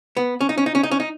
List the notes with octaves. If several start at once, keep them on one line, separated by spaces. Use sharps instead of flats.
B3
C#4
D#4
C#4
D#4
C#4
D#4
C#4
D#4